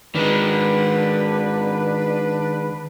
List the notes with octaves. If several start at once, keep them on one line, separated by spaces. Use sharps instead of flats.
D#3 G#3 D4 B4